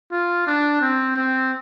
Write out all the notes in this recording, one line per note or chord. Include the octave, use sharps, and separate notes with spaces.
F4
D4
C4
C4